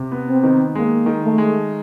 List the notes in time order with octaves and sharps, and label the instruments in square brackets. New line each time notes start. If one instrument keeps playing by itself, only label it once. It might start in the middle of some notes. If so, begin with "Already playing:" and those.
Already playing: [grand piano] C3
B3
[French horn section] C4
[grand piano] D#3
[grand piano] G#3 [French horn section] A#3
[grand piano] D#3
[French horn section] A3
[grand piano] G#3